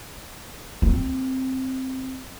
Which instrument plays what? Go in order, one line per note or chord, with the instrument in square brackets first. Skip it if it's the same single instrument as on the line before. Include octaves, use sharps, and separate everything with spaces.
[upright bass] C4